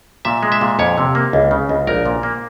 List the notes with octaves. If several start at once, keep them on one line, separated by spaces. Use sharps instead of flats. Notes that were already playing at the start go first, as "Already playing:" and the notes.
A#2 E5
G#3
E5
A#2
F2 C#5
C3
A#3
C#2
C#3
C#2
A#1 A#4
A#2
A#3